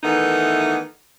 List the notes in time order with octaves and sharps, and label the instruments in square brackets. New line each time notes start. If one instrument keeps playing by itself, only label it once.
[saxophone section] D#3 E3 A3 B3 D#4